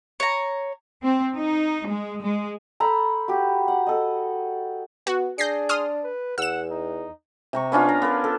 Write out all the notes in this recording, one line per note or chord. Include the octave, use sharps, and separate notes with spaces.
C#5 A#5
C4
D#4
G#3
G#3
A4 C5 A#5 B5
F#4 G4
F#5
A4 D#5
B3 F#4
D4 G#4 G6 A#6 C7
C6 D#6 F6
B4
E2 F#5 E6 E7
D#4
C3 A#5 C#6
B3 C#4 D4 F4
A#5
B3 A#4
A4